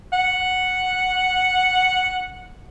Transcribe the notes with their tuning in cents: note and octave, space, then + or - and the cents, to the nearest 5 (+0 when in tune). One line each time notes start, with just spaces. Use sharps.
F#5 -5